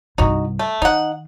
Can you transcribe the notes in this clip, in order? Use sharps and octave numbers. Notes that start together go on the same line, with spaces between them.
C2 G2 D#4 F#4
A3
D#3 D#4 F#5